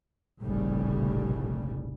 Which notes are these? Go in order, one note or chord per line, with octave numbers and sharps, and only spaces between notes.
F1 A#1 A2 C#3 G3